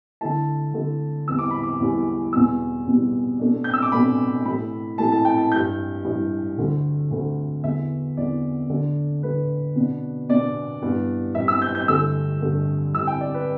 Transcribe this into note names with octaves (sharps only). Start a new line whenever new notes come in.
D3 A3 E4 A5
D3 A3 E4
E2 E3 G3 B3 E6
D6
B5
D6
E2 E3 G3 B3
E2 B2 G3 E6
E2 B2 G3
B2 A3 D4
G6
E6
D6
B2 A3 D4 B5
A2 E3 A3 B5
A2 E3 A3 A5
A5
G5
A5
G2 E3 G3 E4 G6
G2 E3 G3 E4
D2 D3 A3
D2 D3 A3
E2 D3 B3 E5
E2 D3 B3 D5
D3 A3 D4
D3 A3 D4 B4
B2 B3 D4
B2 B3 D4 D5
G2 E3 B3
G2 E3 B3 E5
E6
G6
G6
G2 D3 A3 E6
G2 D3 A3
D3 G3 E4 E6
G5
D5
B4